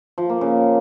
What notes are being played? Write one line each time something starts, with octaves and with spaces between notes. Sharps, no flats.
F3
A#3
C#3